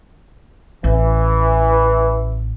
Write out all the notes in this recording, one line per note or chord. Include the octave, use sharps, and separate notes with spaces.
A1 E3